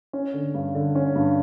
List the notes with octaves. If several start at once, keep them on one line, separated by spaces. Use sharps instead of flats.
C#4
D3
G2
D3
C#4
G2